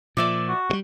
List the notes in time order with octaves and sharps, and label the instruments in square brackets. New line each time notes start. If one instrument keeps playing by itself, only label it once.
[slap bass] A#2 F3 [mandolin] D5 E5 D6
[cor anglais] F#4
[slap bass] G2 G3